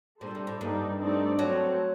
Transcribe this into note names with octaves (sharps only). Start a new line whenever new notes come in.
A#2 G3 D4 A4 C5
C3
A2
G2 G3 A#3 D#4 A4 D5
A3 C4 D#4 A4 D5
F#3 A3 C4 F#4 A4